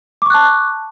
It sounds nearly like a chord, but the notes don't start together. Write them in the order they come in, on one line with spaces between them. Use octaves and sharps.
D6 C#6 F#6 A5